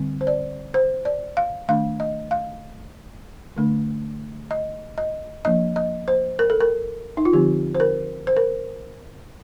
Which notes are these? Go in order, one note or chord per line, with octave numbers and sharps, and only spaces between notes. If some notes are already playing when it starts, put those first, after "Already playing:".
Already playing: D3 G3 C4
C5
D5
C5
D5
F5
D#3 A3 D4 F5
D#5
F5
D3 A3 D4
D#5
D#5
F3 A#3 D4 D#5
D#5
C5
A#4
A4
A#4
D#4
F4
D3 F3 C4 G4
C5
A#4
C5
A#4